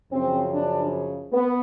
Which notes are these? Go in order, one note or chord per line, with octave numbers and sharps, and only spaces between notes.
F#2 C#3 F3 C4
D4
B3